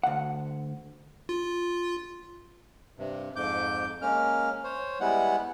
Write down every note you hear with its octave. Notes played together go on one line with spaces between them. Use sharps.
D2 F#5
F4
G2 C3
F2 G#2 D6 G6
G#3 A#3 C#4 F6
C5 C#5
G3 G#3 B3 E4 F#5